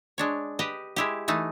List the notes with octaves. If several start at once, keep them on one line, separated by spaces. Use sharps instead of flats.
G#3 D4 C#5
G4 B4 D#5
G#3 E4 G4
E3 A3 D#4